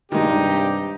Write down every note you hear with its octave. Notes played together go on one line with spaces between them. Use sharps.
G2 C3 D#3 G#3 D#4 G4